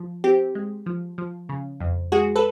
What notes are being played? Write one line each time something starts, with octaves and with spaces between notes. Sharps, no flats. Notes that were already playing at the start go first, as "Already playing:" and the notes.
Already playing: F3
C4 G4
G#3
F3
F3
C#3
F2
G#3 F#4 G#4
A4 B4